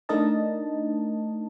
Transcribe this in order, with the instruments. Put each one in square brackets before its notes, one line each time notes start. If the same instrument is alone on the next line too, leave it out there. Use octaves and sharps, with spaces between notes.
[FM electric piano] A3 D4 D#4 A#4 D#5 A5